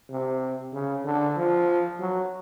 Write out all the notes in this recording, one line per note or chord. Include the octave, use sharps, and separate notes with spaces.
C3
C#3
D3
F3
F#3